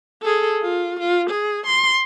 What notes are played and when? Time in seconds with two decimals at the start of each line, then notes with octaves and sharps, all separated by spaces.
0.22 G#4 A4
0.62 F4
0.99 F4
1.30 G#4
1.66 C6